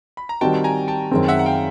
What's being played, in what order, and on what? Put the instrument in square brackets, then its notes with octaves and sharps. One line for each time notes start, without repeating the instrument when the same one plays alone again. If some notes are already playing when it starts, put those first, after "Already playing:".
[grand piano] B5
A#5
[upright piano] D#3 G3 C4 D#4 F#4 [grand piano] G5 A5
[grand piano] G#5 A#5
G5 A5
[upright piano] F#2 D#3 G#3 C4
[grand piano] E5 F#5
F#5
F5 G5